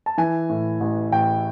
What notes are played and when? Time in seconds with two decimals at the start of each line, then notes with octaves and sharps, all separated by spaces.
0.06 A5
0.18 E3 G#5
0.49 A2
0.80 A1
1.12 A1 G5